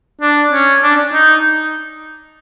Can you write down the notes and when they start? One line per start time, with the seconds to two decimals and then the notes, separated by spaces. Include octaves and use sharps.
0.21 D4
0.52 C#4
0.83 D4
1.14 D#4